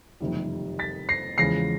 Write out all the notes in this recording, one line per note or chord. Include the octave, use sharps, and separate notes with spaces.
F#1 F2 C3 D#3 G3
A6 B6
A#6 C7
E2 C#3 F3 G#3 A#6 C7